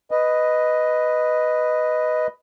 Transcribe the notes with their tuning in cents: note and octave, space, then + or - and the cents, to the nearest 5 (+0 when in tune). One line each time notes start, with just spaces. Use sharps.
B4 +5 D#5 +0